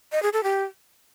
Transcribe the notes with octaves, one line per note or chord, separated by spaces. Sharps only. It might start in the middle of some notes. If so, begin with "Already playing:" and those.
D#5
G#4
A4
G4